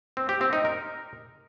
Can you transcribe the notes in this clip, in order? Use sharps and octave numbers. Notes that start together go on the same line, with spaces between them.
C4
G4
C4
D#4
A#4